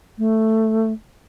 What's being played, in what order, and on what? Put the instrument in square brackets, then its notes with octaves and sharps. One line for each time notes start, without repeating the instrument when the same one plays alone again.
[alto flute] A3